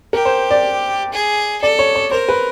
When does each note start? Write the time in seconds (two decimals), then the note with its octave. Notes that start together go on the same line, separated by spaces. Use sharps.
0.13 G4 A#4
0.25 C5
0.51 D5
1.13 G#4
1.61 A4 D5
1.79 C#5
1.95 C#5
2.11 A#4 C5
2.29 B4